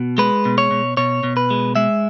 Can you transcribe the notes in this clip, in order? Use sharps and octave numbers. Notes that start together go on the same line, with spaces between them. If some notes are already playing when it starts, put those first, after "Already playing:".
Already playing: B2
G#3 B4
B2
C#5
B2
B2 C#5
B2
B4
G#3
G#3 E5